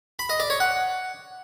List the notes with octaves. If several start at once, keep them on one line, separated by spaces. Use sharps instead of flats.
B5
D#5
D5
C#5
F#5